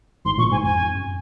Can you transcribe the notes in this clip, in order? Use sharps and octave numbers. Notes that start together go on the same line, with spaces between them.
G#1 G#2 C6
A#1 A#2 C#6
G#1 G#2 G#5
F2 G#5
F2
F#2